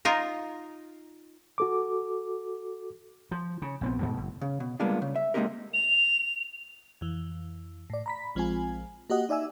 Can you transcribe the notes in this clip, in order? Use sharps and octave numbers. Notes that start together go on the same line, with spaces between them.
D#4 F4 A#4
F#4 A4 D6
F3
C#3
A#1 B3 C4
D#2 G#2 B2 A3
F#1
C#3
B2
G3 G#3 A#3 B3 D4 F4
C#3
E5
G#3 A#3 C4 D#4 G4 A#4
F7
F2 E3
A2 D5
A#5 B5 B6
A#1 F3 G#3 C4 F4 G#5
A#3 F#4 G4 D#5 F#5
D#4 D5 E5 G#5 E6